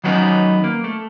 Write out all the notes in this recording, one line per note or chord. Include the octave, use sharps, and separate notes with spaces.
D#3 F#3 G3 B3 C#4 D#4
A#3
A3